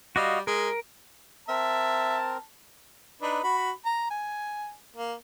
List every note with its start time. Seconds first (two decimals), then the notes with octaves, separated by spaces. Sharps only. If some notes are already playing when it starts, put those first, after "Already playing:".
0.16 G3 F#4 D#5 F5
0.47 G#3 A#4
1.49 C4 A#4 E5 A5
3.22 D4 D#4 B4
3.43 F#4 B5
3.86 A#5
4.10 G#5
4.96 A#3